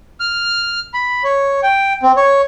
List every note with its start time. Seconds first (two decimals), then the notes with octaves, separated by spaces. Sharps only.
0.20 F6
0.94 B5
1.24 C#5
1.63 G5
2.03 C4
2.17 C#5